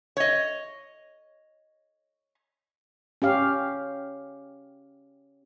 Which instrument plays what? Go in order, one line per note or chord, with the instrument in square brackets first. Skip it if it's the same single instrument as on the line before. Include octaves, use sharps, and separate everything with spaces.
[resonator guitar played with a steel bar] C#5 D#5
[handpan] C#4 G4 F5